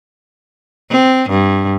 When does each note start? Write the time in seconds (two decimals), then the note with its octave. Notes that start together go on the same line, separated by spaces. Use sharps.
0.90 C4
1.29 G2